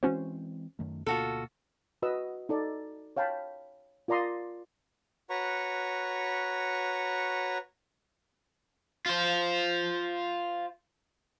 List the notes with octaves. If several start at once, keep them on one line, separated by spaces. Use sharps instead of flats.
E3 G#3 C4 C#4 F#4 C5
F#2 D#3 A3
D2 B2 A#3 F4 F#4 A4
F#4 B4 D#5 E6
D#4 A4 D5
C#5 F5 G5 A5 B5
F4 A#4 D5 A#5 C6 D#6
F#4 B4 C#5 A#5 C#6
F4 C5